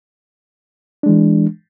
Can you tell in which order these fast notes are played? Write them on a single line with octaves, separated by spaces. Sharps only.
D4 G#3 E3